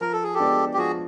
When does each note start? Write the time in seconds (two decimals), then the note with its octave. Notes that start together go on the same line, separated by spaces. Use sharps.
0.01 F3 A#4
0.12 A4
0.23 G#4
0.34 G4 A4
0.40 G#3 B3 D4
0.73 G4
0.78 F3 F#4 G#4